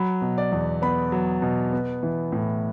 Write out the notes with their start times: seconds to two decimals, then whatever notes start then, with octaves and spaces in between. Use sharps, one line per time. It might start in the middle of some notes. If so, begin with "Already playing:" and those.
Already playing: F#3 B5
0.21 B2
0.38 D5
0.52 E2
0.82 B3 B5
1.12 F#3
1.42 B2
1.73 B3
2.03 E3
2.32 A2